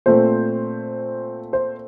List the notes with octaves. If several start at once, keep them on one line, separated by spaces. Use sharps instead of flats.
A#2 A3 C4 C5
C5